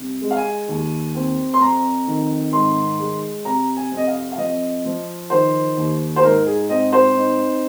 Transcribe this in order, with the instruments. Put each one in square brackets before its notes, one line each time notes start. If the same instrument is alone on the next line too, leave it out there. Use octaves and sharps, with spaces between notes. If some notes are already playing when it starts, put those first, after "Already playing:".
Already playing: [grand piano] C2
G#3
F5
G#5
D#2
C4
C6
F2 A#5
D#3
G#2 C6
G#3
C3 A#5
G#5
F2
D#5
F5
F5
F3 D#5
F3
D#3 C5
D#2
C5
G#2 A#4
G#4
C4 D#5
C5
D#4